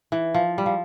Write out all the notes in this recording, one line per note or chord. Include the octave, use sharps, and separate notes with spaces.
E3
F3
G3
F3